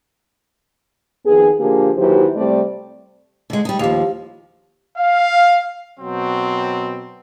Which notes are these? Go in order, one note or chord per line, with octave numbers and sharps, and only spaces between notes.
F2 D#3 B3 G#4
D3 F3 A#3 G4 G#4
D#2 E3 F#3 G4 A#4 C5
C3 G3 A3 C4 D5
D3 G#3
G3 D#4
D#2 F3 G4 F5 F7
F5
B2 F#3 C4